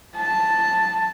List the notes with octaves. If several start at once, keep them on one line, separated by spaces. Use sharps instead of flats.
A5